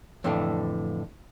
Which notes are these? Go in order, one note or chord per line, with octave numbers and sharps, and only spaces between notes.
F2 A2 D3 E3 A3 D4